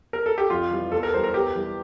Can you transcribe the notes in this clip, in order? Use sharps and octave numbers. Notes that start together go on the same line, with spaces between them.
A#4
A4
G4
F2 F4
E3 G3
E2 A4
A#4
E3 G3 C5
A#4
E2 G4
E3 G3